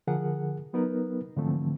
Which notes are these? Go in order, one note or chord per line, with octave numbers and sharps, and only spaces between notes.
D3 F3 G#4 A#4 F#5
F#3 B3 D#4 A#4 B4
G#2 D3 E3 F3 A3 C4